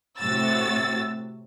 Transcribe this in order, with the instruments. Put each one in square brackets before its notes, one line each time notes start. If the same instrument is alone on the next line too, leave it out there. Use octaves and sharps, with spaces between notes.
[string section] A2 C3 F#4 E6 A6